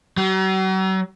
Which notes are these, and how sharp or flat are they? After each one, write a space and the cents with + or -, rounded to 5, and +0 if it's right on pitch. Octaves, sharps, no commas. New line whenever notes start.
F#3 +40